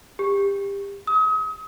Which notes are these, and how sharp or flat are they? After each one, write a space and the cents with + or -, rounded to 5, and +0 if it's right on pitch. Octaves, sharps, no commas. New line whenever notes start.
G4 +25
D#6 +40